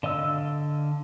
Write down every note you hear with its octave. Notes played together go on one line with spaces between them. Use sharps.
D3 D#5 F5 E6